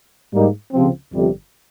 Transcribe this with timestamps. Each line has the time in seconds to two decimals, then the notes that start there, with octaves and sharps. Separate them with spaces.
0.33 G#2 G3 A#3 D#4
0.73 C#2 C3 F3 C4
1.14 G1 F2 C3 G3